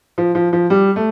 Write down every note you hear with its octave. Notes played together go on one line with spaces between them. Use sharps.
F3
F3
F3
G3
A3